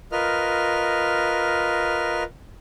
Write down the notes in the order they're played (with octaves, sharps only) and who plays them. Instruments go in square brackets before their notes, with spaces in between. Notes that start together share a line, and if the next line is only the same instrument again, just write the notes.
[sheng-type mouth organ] F4 A#4 B4 D#5 F6